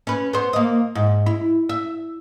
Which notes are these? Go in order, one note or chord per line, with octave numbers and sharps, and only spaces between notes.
C#4 B4
B3 C5
A#3 D#5
G#2
E4
E5